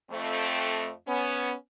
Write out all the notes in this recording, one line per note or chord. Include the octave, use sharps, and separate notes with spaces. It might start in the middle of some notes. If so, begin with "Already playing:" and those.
F2 A3 C4
B3 C#4